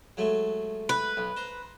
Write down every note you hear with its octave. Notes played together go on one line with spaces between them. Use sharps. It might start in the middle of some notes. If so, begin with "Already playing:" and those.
F#3 G#3 A3
B4
B1
C5 A#5